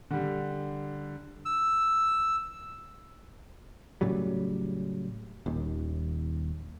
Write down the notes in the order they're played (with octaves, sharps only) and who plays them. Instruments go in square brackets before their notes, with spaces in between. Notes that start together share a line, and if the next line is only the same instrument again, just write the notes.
[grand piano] D3 G3
[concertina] E6
[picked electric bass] A2 C#3 F#3 G3
D#1 D#2